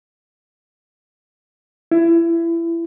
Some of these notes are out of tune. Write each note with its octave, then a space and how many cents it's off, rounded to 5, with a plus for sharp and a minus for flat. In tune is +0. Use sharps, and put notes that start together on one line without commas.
E4 +25